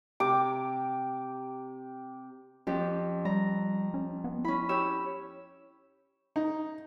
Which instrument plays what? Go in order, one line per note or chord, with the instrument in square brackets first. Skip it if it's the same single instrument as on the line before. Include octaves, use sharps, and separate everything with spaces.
[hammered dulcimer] C3 G4 A#5 D6
[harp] F2 G4 [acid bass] C#4
[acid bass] G3 [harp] A#5
[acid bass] C#4
B3
[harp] C#4 B5 [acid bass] E4
[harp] G4 C#5 E6
[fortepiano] D#4